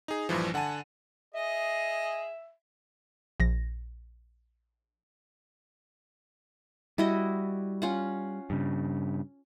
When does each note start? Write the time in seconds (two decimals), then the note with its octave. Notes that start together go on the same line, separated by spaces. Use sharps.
0.08 D#4 G#4
0.29 A#1 G2 E3 F3
0.54 D3 F#5 G#5 A5 D#7
1.34 G#4 D#5 E5
3.40 A#1 A#6
6.98 G3 E4 F#4 D#5
7.82 C#4 F4 F#5
8.50 G2 C#3